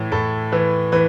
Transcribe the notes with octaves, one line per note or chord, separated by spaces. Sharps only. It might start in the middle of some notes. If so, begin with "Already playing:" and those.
Already playing: A2 E3
A2 A4
E3 B4
E3 B4